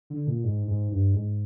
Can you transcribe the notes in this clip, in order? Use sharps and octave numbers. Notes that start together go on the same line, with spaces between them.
D3
A#2
G#2
G#2
G2
G#2